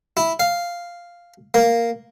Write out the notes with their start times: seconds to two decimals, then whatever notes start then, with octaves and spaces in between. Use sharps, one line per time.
0.17 E4
0.40 F5
1.54 A#3